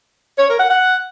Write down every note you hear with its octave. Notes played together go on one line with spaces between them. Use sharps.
C#5
A#4
F#5
F#5